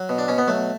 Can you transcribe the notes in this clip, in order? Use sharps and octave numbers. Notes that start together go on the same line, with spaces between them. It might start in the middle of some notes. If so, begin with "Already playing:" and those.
Already playing: F#3
B2
D4
B2 C#4
B3
F#3 A3